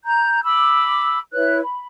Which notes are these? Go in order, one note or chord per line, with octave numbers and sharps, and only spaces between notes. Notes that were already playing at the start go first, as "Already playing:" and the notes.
A#5 G6
B5 D6 E6
E4 B4 C#5 F#6
B5